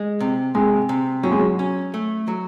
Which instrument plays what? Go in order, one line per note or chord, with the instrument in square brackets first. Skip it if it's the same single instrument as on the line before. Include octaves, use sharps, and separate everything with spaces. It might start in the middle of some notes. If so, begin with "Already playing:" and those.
Already playing: [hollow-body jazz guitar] G#3
C3
[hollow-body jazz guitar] C3 [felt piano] G#3
[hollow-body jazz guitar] C3
[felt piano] F#3 [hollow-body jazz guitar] C#4
[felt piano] G#3
F#3
[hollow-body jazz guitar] C#4
A3
F#3